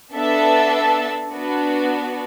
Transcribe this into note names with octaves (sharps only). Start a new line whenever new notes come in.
B3 D4 A4 E5 A5
B3 D4 F#4